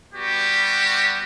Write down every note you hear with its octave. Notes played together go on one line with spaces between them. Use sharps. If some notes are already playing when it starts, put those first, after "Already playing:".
G3 B3 F#4 G4